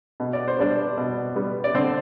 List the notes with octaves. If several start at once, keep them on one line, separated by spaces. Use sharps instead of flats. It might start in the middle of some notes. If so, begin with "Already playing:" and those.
B2
D5
C5
G3 B3 D4 D5
B2
G3 B3
D5
D3 C4 C5